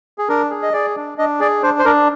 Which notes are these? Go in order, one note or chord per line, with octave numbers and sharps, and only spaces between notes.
G#4
D4 A#4
G#4
D#5
G#4 D5
D4
D4 D#5
G#4 D5
D4 C5
C5
D4 A#4